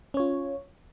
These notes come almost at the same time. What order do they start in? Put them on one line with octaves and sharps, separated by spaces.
C#4 C#5 F4